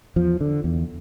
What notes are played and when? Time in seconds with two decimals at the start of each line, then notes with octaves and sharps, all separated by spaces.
0.16 E2 F3
0.41 D3
0.64 E2